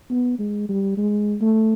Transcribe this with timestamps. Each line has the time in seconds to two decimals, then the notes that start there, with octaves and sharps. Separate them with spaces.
0.11 B3
0.39 G#3
0.69 G3
0.97 G#3
1.41 A3